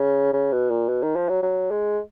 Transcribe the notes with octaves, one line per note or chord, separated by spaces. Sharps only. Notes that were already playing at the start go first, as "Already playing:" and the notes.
Already playing: C#3
C#3
B2
A#2
B2
D#3
F3
F#3
F#3
G#3